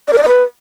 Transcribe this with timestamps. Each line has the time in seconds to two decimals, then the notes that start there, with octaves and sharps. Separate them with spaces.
0.08 D5
0.13 A#4
0.18 D5
0.23 D#5
0.28 B4